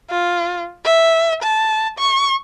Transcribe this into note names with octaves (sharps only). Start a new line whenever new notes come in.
F4
E5
A5
C#6